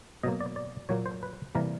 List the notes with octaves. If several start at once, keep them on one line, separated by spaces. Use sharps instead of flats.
B2 F#3 A#3 D#5
D5
D5
A#2 F#3 A#3 C#5
C5
B4
C3 E3 G3 A#3 A#4